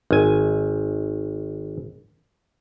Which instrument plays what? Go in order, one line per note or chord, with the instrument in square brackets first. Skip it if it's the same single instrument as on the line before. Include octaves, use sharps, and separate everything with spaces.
[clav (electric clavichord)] G#1 G#5